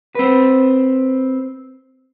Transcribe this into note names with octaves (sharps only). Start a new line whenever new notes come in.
C4 B4